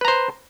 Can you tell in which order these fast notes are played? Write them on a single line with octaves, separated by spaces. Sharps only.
B4 A#5 C5